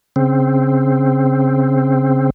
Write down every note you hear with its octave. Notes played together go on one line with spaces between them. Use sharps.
C#3 C4